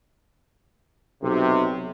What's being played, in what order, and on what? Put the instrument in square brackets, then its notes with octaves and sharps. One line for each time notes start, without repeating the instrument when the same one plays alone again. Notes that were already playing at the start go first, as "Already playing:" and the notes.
[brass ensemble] B1 C3